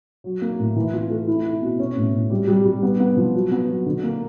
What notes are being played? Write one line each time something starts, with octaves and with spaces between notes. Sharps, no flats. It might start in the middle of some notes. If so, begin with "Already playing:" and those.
F#3
A#3
A2
E3
F4
A3
E4
E4
B2
C#4
A2
A2
G3
G3
G3
B3
B3
F3
F#3
B3
F#3
D3
A#3